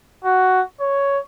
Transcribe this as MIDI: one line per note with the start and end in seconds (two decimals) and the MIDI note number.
0.24 0.60 66
0.80 1.18 73